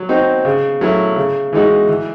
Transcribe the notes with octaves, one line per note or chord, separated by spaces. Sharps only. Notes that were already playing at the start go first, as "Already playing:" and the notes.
Already playing: F#3
C4 D#4 F#4
C#3
F#3 A3 C#4 E4
C#3
E3 G#3 D#4 F#4
E3